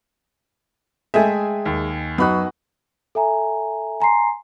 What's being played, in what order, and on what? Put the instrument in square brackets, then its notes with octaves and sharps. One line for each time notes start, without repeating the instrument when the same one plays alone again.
[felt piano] G#3 [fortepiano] A3 G#4 E5 [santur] G5 G#5
[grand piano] D#2
[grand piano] F#2 B5 F#6 [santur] B3 F#4 D#6 [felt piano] D#4
[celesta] A4 E5 G#5 A#5
G#5 A#5 C6 C7